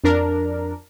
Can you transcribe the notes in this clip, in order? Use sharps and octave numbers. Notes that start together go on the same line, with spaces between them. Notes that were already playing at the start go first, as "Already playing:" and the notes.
F2 D4 A#4